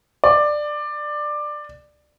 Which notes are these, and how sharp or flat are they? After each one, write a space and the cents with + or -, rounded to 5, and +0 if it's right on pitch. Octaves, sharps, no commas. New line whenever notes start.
D5 +15